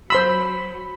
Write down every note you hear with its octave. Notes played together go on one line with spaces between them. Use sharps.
F#3 C5 B5 C6 E6